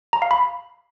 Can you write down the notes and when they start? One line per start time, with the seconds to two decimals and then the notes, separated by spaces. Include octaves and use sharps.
0.13 A#5
0.22 F5
0.31 B5